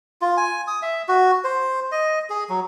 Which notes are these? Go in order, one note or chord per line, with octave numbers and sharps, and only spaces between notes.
F4
G#5
D#6
E5
F#4
C5
D#5
G#4
F#3